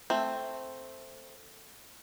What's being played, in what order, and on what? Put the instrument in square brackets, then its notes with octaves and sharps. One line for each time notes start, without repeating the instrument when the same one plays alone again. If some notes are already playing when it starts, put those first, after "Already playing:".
[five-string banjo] A3 C4